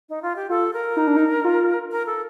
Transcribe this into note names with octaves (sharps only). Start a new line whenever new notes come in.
D#4
F4
G4
F4 A4
A#4
D#4
D4
D#4
F4
A#4
A4